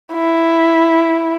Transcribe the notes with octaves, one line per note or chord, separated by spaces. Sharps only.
E4